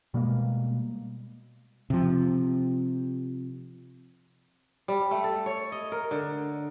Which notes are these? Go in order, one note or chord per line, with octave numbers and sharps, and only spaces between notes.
B2 G3 G#3 A#3
C3 F3
G3
A3
A4
C#5
D#5
A#4
D3